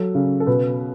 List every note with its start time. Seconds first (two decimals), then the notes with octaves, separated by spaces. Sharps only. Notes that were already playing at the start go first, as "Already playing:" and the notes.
Already playing: F#3 A4
0.15 C#3
0.40 A4
0.47 B2 B4